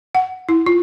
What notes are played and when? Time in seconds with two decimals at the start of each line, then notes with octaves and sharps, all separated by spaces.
0.15 F#5
0.49 E4
0.66 F4